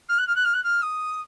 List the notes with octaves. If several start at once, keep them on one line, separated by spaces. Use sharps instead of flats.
F6
F#6
F6
F#6
F6
F#6
F6
D#6